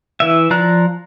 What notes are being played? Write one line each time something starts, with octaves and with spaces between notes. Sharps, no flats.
E3 E5
F3 D5 A#5 F#6